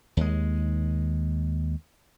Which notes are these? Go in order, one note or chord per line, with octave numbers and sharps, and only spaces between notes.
D#2 G#3